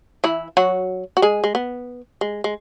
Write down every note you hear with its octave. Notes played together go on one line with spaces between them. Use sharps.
E3 E4
F#3 F#4
F#4
G#3 G#4
G#3
B3
G#3
G#3